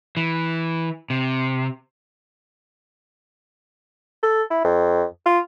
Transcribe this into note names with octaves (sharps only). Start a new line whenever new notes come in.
E3
C3
A4
E4
F2
F4